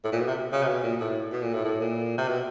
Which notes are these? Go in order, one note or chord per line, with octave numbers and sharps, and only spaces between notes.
A2
A#2
B2
C3
C#3
C3
B2
A#2
A2
B2
A#2
A2
A2
A#2
C3
B2